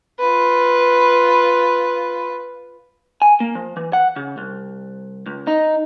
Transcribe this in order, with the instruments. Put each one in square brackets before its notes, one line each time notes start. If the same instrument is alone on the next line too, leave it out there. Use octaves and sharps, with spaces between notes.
[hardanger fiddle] F4 B4
[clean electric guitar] G#5
A#3
F3
E3
F#5
C#3
C2
C#2
D#4